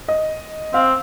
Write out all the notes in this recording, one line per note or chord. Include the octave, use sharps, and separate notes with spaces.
D#5
C4 F5